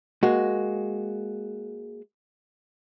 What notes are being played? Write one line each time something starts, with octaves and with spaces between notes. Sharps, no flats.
G#3 A#3 F#4